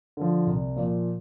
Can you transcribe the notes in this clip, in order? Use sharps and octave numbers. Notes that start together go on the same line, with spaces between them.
D3 F3
C2
A#2 F3